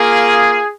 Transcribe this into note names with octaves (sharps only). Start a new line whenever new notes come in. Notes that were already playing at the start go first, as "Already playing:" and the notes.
Already playing: A#3 F4 G#4